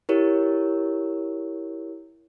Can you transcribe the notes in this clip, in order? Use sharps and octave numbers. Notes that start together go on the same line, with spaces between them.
E4 G4 A#4 C#5